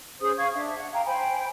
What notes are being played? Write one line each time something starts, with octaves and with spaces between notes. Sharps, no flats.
C#4 G#4 C5 D#6
F5 C#6 G#6
D4 E5
F#5
F5 G5 A#5
C5 G5 G#5 B5